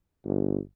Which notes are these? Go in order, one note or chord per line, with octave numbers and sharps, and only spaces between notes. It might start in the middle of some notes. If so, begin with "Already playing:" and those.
G1